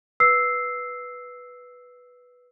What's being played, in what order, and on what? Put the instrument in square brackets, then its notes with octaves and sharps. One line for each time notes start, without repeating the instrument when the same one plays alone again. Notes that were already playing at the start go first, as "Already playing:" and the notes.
[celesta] B4 E6 C7